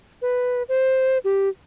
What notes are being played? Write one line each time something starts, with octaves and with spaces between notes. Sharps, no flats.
B4
C5
G4